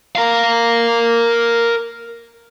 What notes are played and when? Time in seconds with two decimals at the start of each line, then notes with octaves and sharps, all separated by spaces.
0.15 A#4 F5